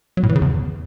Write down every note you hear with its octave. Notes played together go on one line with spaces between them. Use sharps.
F#3
A2
E3
C#3
E2